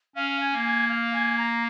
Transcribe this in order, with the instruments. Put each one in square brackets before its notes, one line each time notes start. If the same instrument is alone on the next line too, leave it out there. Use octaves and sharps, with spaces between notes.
[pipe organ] C#4 [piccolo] F5
[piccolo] G#5
[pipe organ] A#3
[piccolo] G#5
F5
G#5
A#5